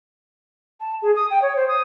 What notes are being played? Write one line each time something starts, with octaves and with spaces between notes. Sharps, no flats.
A5
G#4
D#6
G5
C#5
C5
D#6